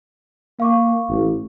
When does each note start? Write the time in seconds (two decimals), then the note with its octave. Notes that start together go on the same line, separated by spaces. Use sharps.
0.60 A#3 F5 C#6 D6
1.09 A1